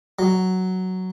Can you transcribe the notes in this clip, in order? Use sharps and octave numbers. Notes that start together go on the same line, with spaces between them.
F#3